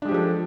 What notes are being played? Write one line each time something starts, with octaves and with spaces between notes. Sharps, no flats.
F3 G#3 D4 G4 A4